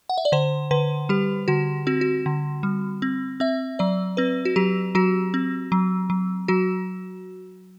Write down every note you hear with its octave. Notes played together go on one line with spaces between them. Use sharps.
F#5
E5
D5
D3 C5
D3 B4
G3 G4
D3 F#4
C4 F#4
F#4
D3
G3
C4
C4 E5
F#3 D5
C4 B4
F#4
F#3 G4
F#3 F#4
C4
F#3
F#3
F#3 F#4